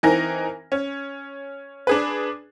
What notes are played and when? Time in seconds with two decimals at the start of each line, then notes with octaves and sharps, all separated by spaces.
0.03 E3 C4 D#4 A#4 G#5 A#6
0.72 C#4
1.87 D4 G#4 B4